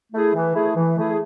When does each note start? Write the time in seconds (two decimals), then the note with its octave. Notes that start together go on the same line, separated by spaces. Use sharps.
0.12 A3 E4 G#4
0.34 E3
0.54 A3 E4 G#4
0.76 E3
0.96 A3 E4 G#4